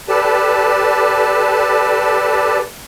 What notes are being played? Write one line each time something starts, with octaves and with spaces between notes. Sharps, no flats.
G4 A4 B4 D5 A5